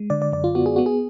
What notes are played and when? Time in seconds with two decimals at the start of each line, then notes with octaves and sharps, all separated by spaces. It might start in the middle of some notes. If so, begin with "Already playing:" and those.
Already playing: G#3
0.10 D3 D5
0.22 D5
0.32 F#2 D5
0.44 F4
0.55 B3 F#4
0.66 G#4
0.76 B3 F#4
0.86 G#4